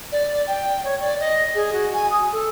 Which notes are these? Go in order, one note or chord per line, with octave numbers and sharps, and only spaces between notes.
D5
G5
C#5
D5
D#5
G#4
F#4
G#5
D#6
A4